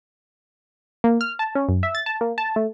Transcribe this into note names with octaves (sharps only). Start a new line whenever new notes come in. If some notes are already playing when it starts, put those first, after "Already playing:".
A#3
F6
A5
C#4
F#2
E5
A6
A5
A#3
A5
A3